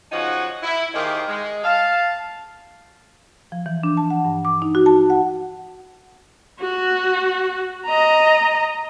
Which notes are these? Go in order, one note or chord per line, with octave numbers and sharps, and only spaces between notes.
C#3 F3 D#4 F#4 F#5 G#5
E4
D#3 A#3 D#4 G4 G#4 C5
G#3
F5 A5
F3
E3
D4
A5
F#5
G2
D6
D#4
F#4
A5
F#5
F#4
D#5 A#5